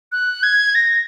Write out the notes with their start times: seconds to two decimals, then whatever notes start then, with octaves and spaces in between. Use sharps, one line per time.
0.12 F#6
0.43 G#6
0.75 A#6